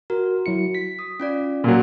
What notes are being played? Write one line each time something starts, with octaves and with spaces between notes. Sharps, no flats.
F#4 A#4
F#3 E4 C#7
B6
D#6
C#4 F4 D5
A#2 F#3 A#3